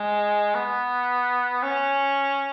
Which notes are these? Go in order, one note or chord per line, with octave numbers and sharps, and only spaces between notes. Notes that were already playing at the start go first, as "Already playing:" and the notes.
Already playing: G#3
B3
C#4